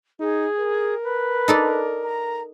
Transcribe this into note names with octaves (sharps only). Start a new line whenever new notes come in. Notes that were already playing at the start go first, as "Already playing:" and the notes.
D#4 G#4
A#4
B4
D#4 A4 D5
A#5